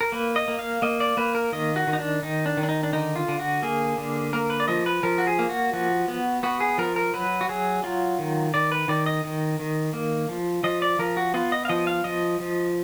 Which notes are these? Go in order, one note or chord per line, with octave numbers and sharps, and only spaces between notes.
A#4
A#3 B4
D#5
A#3
F5
A#3 D#5
D5
A#3 B4
A#4
D#3 D#5
F#4
D#3
D#4
D4
D#3 D#4
D4
D#3
D4
D#4
D4
D3 D#4
F4
D3
F#4
A#3 G#4
D3
A#3 A#4
B4
D5
F3 D#5
B4
F3 A#4
F#4
G#4
A#3
F#4
F3 F#4
B3
B3 F#4
G#4
F3 A#4
A#4
F#3 B4
F#4
F#3 G#4
F#3 F4
D#3
D#3 D5
B4
D#3 D5
D#5
D#3
D#3
A#3
F3
F3 D#5
D5
F3 A#4
F#4
B3 F4
D#5
F5
F3 D#5
F5
F3 D#5
F3